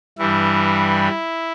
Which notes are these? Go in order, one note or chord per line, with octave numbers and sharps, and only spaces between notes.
G2 E3 G3 E4